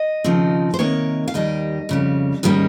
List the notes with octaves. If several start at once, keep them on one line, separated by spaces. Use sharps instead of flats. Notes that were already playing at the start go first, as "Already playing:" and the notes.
Already playing: D#5
D#2 C#3 F3 C4 D#4
C5
C3 D#3 A#3 D#4 C#5
F5
D#2 D#3 G3 D#5
F2 C#3 G3
G#2 D#3 G3 A#3 C#4